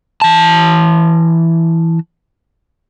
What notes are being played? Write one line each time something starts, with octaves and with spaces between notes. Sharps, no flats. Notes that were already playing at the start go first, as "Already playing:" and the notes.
E3 A5